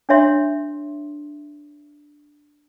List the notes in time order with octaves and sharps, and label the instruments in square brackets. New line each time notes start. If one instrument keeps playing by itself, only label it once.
[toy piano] D4 F#4 C#5 E5 C6